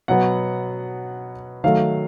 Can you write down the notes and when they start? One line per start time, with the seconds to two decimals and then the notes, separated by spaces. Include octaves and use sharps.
0.08 B2 F#3 B3 F#5
1.64 D#3 F#3 A3 F5